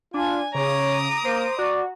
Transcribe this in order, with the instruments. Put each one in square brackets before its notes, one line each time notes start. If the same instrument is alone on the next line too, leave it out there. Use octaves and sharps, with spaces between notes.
[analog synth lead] D4 [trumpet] F4 [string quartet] G#5
[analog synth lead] C#3 [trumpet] C#5 [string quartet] A#5 D6 D#6
[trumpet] A#3 [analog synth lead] C5
[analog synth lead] F#4 [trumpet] D5